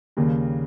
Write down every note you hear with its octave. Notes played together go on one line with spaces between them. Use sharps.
D#2 C#3 G3 A#3